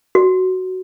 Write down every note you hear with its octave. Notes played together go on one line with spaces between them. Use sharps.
F#4